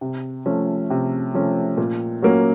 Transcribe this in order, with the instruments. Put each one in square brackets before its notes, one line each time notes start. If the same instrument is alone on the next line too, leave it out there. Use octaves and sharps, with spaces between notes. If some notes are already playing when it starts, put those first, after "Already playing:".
[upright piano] C3
F3 A3 C#4
C3
F3 A3 C#4
A#2
F#3 A#3 C#4